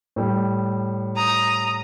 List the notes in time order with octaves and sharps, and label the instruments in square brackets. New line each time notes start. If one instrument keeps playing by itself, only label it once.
[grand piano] A2 G3
[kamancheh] A#5 D#6